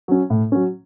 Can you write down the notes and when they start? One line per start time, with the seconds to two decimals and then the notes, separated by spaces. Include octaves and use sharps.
0.08 F#3 C#4
0.30 A2
0.52 F#3 C#4